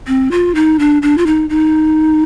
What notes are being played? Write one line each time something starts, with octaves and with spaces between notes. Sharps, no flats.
C4
F4
D#4
D4
D4
F4
D#4
D#4